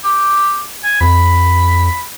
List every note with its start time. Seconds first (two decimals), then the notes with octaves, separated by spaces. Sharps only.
0.04 G4
0.84 G#5
1.01 F2 B5